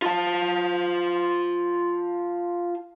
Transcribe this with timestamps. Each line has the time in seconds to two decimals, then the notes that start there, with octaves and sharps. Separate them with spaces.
0.02 F4 A5